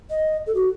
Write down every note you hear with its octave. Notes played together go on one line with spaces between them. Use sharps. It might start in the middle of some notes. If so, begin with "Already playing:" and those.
D#5
A4
F#4